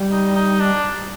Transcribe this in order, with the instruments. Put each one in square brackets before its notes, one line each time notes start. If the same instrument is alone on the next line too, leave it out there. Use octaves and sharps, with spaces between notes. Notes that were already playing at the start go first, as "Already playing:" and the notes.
Already playing: [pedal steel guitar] G3
[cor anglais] D#4
D#4
D4